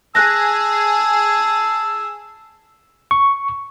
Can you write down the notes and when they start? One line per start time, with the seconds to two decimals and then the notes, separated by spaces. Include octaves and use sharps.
0.15 G#4 A5 E6 F#6 A#6
3.11 C#6